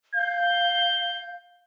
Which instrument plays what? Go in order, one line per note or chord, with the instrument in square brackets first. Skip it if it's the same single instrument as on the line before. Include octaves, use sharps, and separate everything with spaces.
[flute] F5 [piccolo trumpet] G6